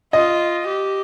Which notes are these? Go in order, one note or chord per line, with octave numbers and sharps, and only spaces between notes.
F4 D#5
G4